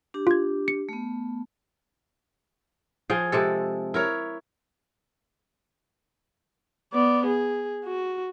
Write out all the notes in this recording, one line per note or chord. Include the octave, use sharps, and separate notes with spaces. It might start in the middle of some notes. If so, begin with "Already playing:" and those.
D4 G4
F4 G#6
C#7
A3 B3
F3 G#4 G5
C3 G#3 A4
E4 A#4 C#5
B3 D5
G#4
F#4